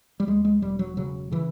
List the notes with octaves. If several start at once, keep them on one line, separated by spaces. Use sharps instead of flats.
G3
D#2 G#3
G#3
E1 G3
F#3
C#3 F#3
C#3 E3